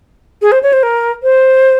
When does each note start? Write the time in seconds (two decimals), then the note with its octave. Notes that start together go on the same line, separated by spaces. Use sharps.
0.42 G#4
0.52 C5
0.63 C#5
0.73 C5
0.83 A#4
1.23 C5